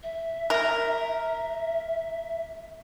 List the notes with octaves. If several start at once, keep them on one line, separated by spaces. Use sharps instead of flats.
E5
A#4